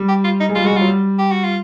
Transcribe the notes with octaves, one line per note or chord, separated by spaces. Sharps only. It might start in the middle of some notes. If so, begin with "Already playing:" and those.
Already playing: G3
G4
F4
D#4
G#3
G3 F4
G#3 F#4
G3 F4
F#3
G3
G4
F#4
F4